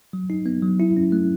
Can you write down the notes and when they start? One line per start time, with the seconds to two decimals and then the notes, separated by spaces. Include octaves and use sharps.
0.13 F#3
0.30 D#4
0.46 B3
0.62 F#3
0.80 E4
0.97 C#4
1.12 A3